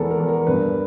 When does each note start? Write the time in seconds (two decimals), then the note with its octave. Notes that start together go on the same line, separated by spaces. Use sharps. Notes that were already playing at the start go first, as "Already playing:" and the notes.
Already playing: E2 G#3 B3 A4 A#4
0.11 A#4
0.20 E2
0.28 A#4
0.47 G2 B4